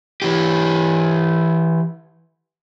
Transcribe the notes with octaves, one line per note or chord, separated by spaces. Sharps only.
E3 G4